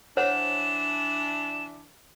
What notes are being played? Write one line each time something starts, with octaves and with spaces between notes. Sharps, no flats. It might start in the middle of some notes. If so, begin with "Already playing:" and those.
E3 D4 C5 C#5 F#5 E7